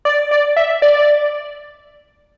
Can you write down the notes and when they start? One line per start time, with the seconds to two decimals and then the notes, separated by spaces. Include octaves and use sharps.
0.05 D5
0.31 D5
0.56 E5
0.82 D5